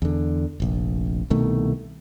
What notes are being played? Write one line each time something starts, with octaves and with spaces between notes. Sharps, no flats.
E2 D3
F1 A#1
C2 B2 D#3 A3